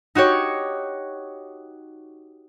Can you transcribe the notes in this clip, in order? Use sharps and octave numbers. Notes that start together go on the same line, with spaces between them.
D#4 F#4 G4 C#5